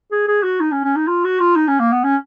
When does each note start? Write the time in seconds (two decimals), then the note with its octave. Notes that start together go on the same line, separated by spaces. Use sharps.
0.11 G#4
0.28 G#4
0.43 F#4
0.60 D#4
0.72 C#4
0.84 C#4
0.96 D#4
1.07 F4
1.24 F#4
1.39 F4
1.56 D#4
1.68 C#4
1.80 A#3
1.92 B3
2.04 C#4